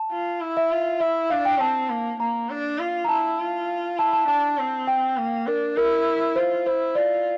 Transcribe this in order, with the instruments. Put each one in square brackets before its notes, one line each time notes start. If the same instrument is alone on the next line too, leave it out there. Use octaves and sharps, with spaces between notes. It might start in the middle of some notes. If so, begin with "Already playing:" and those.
Already playing: [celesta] A5
[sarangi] F4
E4
[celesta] E5
[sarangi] F4
[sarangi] E4 [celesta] E5
[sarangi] D4 [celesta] F5
[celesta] G5
[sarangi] C4 [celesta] A5
[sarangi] A#3
[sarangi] A#3 [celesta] A#5
[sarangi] D4
F4
[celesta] A#5
[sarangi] E4 [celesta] A5
[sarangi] F4
[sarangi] E4 [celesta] A5
[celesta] A5
[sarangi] D4 [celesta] A5
[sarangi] C4
[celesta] G5
[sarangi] A#3
[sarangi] D4 [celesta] A#4
[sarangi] E4 [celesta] A#4
[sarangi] F4 [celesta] C5
[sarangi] E4 [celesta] C5
[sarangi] F4 [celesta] D5